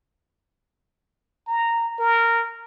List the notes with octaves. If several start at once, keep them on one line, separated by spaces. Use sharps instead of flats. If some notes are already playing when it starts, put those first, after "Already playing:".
A#5
A#4